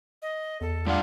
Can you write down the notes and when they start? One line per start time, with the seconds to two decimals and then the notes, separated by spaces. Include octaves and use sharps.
0.22 D#5
0.61 E2 A4
0.87 G3 A3 D4 F4 F#5